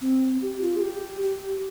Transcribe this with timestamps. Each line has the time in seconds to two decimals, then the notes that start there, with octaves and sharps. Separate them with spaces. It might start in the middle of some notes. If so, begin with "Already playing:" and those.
0.01 C4
0.42 G4
0.61 F4
0.76 G#4
0.82 G4
1.22 G4